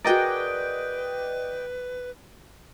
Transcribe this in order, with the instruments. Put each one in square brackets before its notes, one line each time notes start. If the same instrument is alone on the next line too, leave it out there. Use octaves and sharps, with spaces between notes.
[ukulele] F#4 G#4 A#4 [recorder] B4 [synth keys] D5 D#5 G5